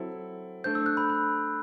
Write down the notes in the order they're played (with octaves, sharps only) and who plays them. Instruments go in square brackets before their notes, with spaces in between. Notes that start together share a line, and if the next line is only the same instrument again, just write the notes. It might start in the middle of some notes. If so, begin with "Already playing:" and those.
Already playing: [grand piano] F#3 C4 E4 A4
[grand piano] A3 D4 A4 C5 [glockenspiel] G6
[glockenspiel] E6
F#6
B5
B5